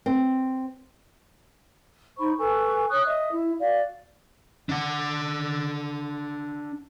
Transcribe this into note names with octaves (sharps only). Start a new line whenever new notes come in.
C4
D#4 C5 B5 C#6
A4 B4 G#5 C#6
C#5 C#6 D#6 F#6
D#5 E5 D#6
E4
F#4 D5 F5
D4 F#5